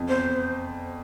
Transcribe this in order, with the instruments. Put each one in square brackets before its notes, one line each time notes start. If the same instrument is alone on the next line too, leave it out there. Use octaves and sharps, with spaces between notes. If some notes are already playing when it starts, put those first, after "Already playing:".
Already playing: [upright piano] F2
[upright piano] E2 [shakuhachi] C5